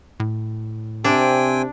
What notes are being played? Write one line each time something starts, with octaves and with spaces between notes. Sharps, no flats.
A2
C3 C4 D4 G5 G#5